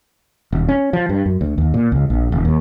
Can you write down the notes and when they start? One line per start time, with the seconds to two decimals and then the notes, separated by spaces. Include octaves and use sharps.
0.52 D#1
0.68 C#4
0.93 F3
1.09 G2
1.26 F#2
1.41 D2
1.58 D#2
1.74 A#2
1.92 C#2
2.10 A#1
2.32 D#1
2.45 D#2